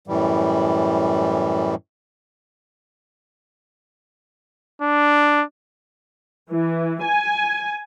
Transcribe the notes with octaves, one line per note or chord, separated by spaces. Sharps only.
F#2 A2 E3 G3
D4
E3
G#5